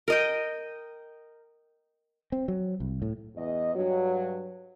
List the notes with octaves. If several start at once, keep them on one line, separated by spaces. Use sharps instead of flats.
A#4 D#5 G5
C4
F#3
C2
A2
E2 D#5
G2 F#3